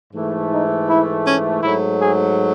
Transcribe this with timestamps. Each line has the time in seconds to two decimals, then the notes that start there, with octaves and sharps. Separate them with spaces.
0.13 G#2 E3 A3
0.50 D#4
0.88 E4
1.25 C#4
1.63 G#2 F#3 A3 E4
2.00 G#4